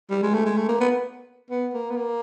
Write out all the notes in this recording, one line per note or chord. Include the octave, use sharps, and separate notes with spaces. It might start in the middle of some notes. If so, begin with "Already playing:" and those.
G3
G#3
A3
G#3
A3
A#3
B3
B3
A#3
B3
A#3